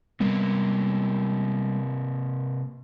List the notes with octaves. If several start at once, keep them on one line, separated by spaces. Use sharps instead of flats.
C3 G3 G#3 A#3 B3